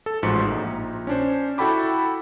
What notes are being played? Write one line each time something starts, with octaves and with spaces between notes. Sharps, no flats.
A4
A1 G#2 F3 F#4 C#7
A#1 D#4
C#4 D4 C5
E4 F#4 A4 G5 B5 D6